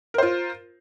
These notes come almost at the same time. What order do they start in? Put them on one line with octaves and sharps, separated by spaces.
A#4 C5 F4